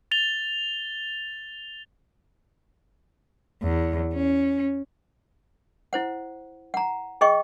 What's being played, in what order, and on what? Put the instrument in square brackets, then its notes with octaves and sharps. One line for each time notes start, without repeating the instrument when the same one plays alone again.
[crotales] A6 F7 G7
[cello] E2
C#4
[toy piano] E4 C5 F#5
F#5 A#5
G#4 D#5 G5 C#6